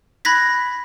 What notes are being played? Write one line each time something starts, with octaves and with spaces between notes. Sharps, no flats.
B5 F#6 G#6 A#6 B6